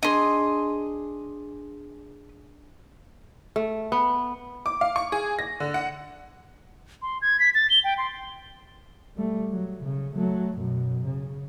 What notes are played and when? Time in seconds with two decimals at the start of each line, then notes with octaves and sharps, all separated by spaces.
0.03 D4 G#4 D#5 C6
3.56 A3
3.92 B3
4.66 D6
4.81 F5
4.96 C#6
5.12 G#4
5.39 A#6
5.60 D3
5.74 F#5
7.02 C6
7.22 G#6
7.40 B6
7.55 A6
7.70 G7
7.84 G5
7.98 C6
9.16 G3 A3
9.50 F#3
9.84 C#3
10.14 F#3 A3
10.57 F#2 B2
11.04 C#3